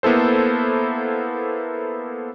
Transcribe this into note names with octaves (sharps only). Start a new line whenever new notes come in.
A#3 B3 E4 A4 C5